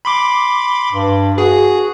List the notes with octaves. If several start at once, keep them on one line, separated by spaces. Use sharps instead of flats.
B5 C6 D6
G2
F#4 G#4